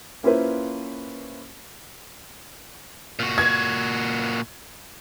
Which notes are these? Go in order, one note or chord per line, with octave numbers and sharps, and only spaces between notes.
A#3 C#4 E4 F4 B4 C5
A#2 F#4
G#6